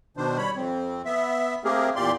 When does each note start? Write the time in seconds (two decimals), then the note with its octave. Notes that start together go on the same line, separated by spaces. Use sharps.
0.17 B2 D#3 D4 C5
0.38 G3 C#5 B5
0.56 F2 C4
1.05 B3 E5
1.65 A3 A#3 C4 G4 G#4 A#4
1.96 E2 A#2 G4 D5 C6